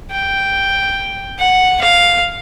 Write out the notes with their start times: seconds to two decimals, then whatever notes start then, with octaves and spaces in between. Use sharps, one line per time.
0.11 G5
1.38 F#5
1.81 F5